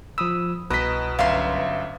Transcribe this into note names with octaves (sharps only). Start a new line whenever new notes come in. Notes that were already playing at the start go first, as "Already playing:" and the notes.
F3 B5 D#6 E6
C2 B2 B4 D#5 A#5 B6
G1 F#2 E5 F5 A#5 C6